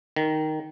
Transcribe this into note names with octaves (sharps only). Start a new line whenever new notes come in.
D#3